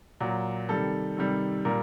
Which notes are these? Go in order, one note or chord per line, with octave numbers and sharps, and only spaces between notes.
A#2 F#3
C3 D#3 G3 A4
C3 D#3 G3
A#2 G3 A#4